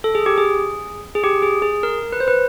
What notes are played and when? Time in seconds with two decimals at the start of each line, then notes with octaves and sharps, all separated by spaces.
0.04 A4
0.15 G#4
0.26 G4
0.38 G#4
1.15 G#4
1.24 G4
1.42 G#4
1.62 G#4
1.83 A#4
2.12 B4
2.20 C5
2.28 B4